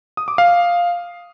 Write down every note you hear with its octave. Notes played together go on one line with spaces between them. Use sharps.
D#6
D6
F5